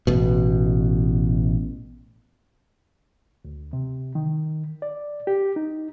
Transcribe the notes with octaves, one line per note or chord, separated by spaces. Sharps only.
A1 B2
D2
C3
D#3
D5
G4
D#4